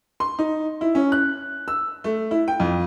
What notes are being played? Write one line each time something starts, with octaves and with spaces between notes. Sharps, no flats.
C6
D#4
E4
C#4
F#6
E6
A3
E4
G5
F2